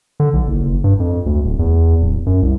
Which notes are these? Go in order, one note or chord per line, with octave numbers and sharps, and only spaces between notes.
D3
B1
F#1
F#1
G2
F2
D2
D1
E2
D1
F#2
C2